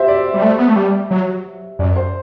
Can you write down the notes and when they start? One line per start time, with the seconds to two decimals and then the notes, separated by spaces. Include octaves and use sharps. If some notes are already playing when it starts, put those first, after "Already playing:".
Already playing: F#4 G4 C5 E5
0.08 D5
0.34 G3
0.42 A3
0.58 B3
0.68 A3
0.76 G3
1.11 F#3
1.79 F#2 D5
1.96 C5